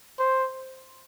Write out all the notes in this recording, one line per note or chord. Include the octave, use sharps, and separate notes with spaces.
C5